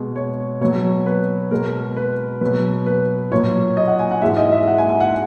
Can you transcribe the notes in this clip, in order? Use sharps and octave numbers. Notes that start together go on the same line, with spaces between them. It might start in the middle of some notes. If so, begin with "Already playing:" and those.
Already playing: B2 G#3
C#5
B2 F#3 C#5
B4
B2 G#3 A#4
B4
B2 F#3 B4
B4
A#2 F#3 C#5
D#5
F#5
G#5
F#5
G#2 E3 G#3 E5
D#5
E5
F#5
G#5
G#5
F#5